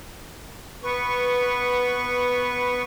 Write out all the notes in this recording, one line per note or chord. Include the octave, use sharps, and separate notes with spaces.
B3 B4 C#6